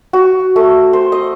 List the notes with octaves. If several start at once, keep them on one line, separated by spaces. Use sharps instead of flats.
F#4
A3
C5
D#5